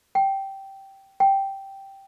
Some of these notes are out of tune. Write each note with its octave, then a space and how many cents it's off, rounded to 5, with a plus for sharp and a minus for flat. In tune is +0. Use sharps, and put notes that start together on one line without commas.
G5 -10
G5 -5